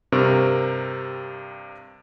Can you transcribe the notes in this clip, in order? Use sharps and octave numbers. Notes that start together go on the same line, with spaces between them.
G2 C3 C4 A#4 C#6